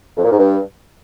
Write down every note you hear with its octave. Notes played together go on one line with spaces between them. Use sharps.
F2
A#2
G#2
G2